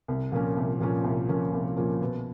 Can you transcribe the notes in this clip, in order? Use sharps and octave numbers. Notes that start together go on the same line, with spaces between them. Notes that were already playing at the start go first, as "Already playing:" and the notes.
C2
A#2 F3 A#3 C#4
C2
A#2 F3 A#3 C#4
C2
A#2 F3 A#3 C#4
C2
A#2 F3 A#3 C#4
B2